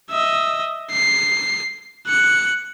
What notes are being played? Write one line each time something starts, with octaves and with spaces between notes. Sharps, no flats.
D#5 E5
C7
F#6 C#7